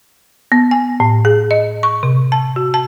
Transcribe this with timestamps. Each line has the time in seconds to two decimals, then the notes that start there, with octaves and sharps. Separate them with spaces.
0.52 B3
0.71 G#5
1.00 A2
1.25 G#4
1.51 D#5
1.83 C#6
2.03 C3
2.32 A5
2.56 F#4
2.74 A5